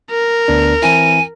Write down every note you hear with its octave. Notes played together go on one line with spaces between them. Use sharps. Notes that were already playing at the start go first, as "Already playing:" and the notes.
A#4
D2 B3 D4
E3 C4 E4 G#5